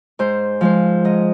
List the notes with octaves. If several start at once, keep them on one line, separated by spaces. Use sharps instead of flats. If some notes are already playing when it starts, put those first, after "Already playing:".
G#2 C5
F3 G#3 C5
G#2 D#5